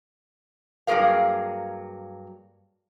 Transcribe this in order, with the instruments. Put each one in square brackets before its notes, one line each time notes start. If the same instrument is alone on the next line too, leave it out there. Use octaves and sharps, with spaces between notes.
[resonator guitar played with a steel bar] G2 F#3 A#3 G#4 A#4 F5